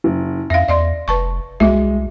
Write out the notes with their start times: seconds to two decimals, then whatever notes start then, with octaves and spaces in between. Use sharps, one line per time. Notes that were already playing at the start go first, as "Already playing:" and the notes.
0.04 F#1
0.50 F2 E5 F5 A#6
0.68 E2 D5 D#5 C6
1.08 F1 B4 A5 C#6
1.60 C2 G#3 F#4 D#5 E5